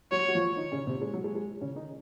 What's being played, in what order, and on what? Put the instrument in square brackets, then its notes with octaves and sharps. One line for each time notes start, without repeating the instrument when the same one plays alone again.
[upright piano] F#3 F#4 [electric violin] C#5
[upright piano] F#4
F3 F4
D#3 D#4
C#3 C#4
C3 C4
G#3
F#3
G#3
G#3
C#3 C#4
D#3 D#4